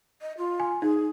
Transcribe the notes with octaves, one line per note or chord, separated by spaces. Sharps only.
D#5
F4
G#5
D#4 G#4